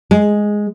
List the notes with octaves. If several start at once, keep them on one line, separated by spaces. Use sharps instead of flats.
G#3